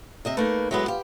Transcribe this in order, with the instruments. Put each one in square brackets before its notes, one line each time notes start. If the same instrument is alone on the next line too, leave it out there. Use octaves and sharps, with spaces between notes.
[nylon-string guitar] C3 D#5 E5
[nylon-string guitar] A3 A#3 D#4 [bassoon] B4
[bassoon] A2 [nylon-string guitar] F#3 G#3 B3
[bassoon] F4 [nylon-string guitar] G4